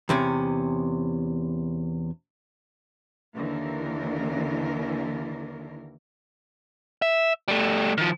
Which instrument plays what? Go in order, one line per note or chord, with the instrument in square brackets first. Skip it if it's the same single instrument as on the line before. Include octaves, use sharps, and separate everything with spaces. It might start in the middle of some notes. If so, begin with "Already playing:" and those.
[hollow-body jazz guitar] E2 C3 C#4
[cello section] D#2 D3 E3 A#4
[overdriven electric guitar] E5
G3 A3
D#3 F3